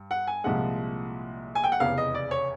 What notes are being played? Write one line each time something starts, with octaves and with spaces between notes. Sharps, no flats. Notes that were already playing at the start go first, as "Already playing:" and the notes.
Already playing: G2
F#5
G#5
C2 A#2 F3 G#3 F#5
G#5
G5
F#5
F1 E2 C#3 F5
D#5
D5
C#5